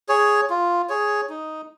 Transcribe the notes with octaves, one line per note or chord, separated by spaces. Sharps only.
G#4 C#5
F4
G#4 C#5
D#4